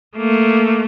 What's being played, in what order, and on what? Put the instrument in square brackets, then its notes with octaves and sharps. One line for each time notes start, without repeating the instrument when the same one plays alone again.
[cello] A3 A#3